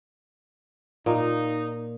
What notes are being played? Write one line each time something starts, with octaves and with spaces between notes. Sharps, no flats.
A#2 D#4